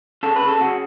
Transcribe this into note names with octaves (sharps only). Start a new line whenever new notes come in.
C#3 A4
B4
C#3
A4
C#3 F#4